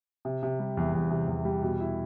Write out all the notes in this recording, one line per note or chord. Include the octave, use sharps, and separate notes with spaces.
C3
C3
G3
E2
E2
C3
E2
G3
B2
E4